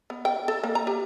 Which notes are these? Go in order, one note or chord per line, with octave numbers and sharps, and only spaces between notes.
B3
G5
A4
A#3
A#5
G4